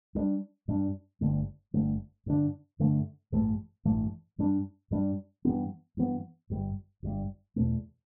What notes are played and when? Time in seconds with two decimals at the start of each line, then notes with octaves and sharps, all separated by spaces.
0.15 G2 G3 D4
0.68 G2 G3 D4
1.21 G1 G2 D3 A3
1.74 G1 G2 D3 A3
2.26 G2 D3 A3 D4
2.79 G2 D3 A3 D4
3.32 A1 G2 E3 A3
3.85 A1 G2 E3 A3
4.38 G2 G3 D4
4.91 G2 G3 D4
5.45 G2 E3 B3
5.97 G2 E3 B3
6.50 G1 G2 G3
7.03 G1 G2 G3
7.56 E2 B2 A3